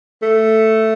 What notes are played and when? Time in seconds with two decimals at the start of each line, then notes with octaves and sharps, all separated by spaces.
0.22 A3